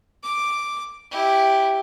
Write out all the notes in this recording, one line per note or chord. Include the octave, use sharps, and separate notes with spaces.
D6
E4 G4